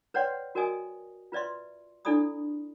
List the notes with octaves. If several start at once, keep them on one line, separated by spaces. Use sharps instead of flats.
B4 C#5 D5 F#5 G5 C6
F#4 A#4 D5 D#5 G#5 D#6
F4 B4 D5 E5 C6
D4 E4 A4 D5 B5 D#6